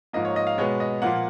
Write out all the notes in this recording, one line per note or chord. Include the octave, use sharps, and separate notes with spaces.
G#2 F3 A#3 D#5
C#5
D#5
F5
B2 G#3 B3 C#5
D#5
A#2 F3 A#3 F#5